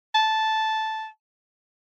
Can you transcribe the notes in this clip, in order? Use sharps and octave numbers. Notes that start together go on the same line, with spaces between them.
A5